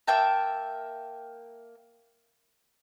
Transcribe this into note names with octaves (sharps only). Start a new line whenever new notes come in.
A#3 E5 G5 A5